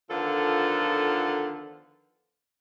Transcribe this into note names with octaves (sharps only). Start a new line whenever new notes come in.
D3 D#3 F3 B3 F4 A4